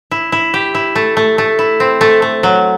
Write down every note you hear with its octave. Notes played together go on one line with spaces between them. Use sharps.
E4
E4
G4
E4
A3
A3
A3
E4
C4
A3
A3
F#3